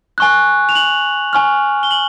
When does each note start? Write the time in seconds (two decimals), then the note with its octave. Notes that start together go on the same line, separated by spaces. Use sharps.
0.18 G#5 C#6 F#6
0.69 F7
0.75 F#7
1.33 G#5 C#6 F6
1.83 G7
1.91 F#7